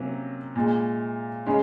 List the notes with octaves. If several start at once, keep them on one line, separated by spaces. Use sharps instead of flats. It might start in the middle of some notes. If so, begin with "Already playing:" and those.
Already playing: C3 F#3 A#3 C#4
A#2 G#3
C#3 G#3 C#4